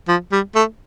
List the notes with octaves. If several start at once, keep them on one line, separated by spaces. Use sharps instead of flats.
F3
G3
A3